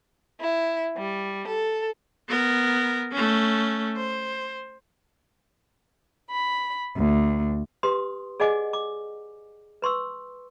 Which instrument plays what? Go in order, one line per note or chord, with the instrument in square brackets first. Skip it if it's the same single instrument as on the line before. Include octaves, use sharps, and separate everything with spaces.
[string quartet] E4
G3
A4
[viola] B3 A#4
A3 C#4
C5
[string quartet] B5
D2
[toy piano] G4 B4 C6 D#6
G#4 D5 D#5 F#5 G#5 D6
D6
B4 C6 C#6 E6